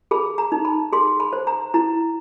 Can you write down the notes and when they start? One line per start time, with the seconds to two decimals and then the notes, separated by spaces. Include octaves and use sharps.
0.11 G#4 B5
0.38 A#5
0.52 D#4
0.65 B5
0.92 G#4 C6
1.20 B5
1.33 C5
1.47 A#5
1.74 E4 A#5